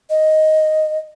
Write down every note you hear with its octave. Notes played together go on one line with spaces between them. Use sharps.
D#5